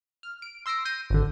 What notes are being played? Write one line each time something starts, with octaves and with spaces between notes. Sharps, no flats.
F6
D7
C6 E6 A#6 C7 D7
G6 A#6 C7 D#7
G#1 D3